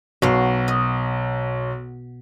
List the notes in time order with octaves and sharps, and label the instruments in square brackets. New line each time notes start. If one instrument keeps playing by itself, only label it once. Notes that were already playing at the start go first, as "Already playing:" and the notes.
[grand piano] B1 [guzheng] B2 F5
[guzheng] D#5